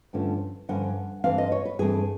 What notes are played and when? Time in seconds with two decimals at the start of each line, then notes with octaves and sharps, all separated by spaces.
0.13 G2 D3 F3 A3 C#4
0.69 G2 D3 F3 C#4 F#5
1.24 G2 E3 A3 C4 F5
1.38 D#5
1.52 C#5
1.65 B4
1.79 G2 E3 A3 C4 G#4